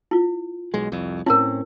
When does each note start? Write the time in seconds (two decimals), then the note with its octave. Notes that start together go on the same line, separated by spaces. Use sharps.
0.11 E4 F4
0.74 B1 B2 G#3
0.92 C2 F2
1.26 A2 C4 C#4 E4 A#4